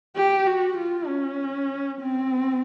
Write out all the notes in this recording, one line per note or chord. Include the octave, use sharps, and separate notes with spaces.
G4
F#4
F4
C#4
C4